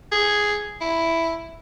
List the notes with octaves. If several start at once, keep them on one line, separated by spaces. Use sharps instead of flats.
G#4
E4